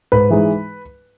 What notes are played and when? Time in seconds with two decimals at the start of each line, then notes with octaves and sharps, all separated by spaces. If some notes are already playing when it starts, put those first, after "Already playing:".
0.12 G#2 B4
0.30 E3 G#3 D#4